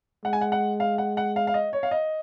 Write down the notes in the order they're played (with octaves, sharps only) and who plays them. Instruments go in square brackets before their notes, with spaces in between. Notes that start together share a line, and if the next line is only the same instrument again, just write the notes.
[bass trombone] G#3 [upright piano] F#5
[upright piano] G#5
F#5
F#5
F5
F#5
F#5
F5
F5
D#5
C#5
F5
D#5